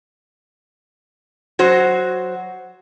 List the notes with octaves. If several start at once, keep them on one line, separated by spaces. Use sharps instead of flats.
F#3 F#4 C5